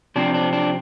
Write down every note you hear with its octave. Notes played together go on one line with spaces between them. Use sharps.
C3 F3 C4 D4
D4
D4